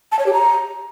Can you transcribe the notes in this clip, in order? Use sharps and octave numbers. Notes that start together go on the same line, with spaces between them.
A5
C#5
G4
A#5